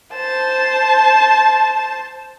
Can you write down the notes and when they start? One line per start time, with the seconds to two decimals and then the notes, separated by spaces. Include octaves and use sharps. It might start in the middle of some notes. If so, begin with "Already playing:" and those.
0.14 C5 A5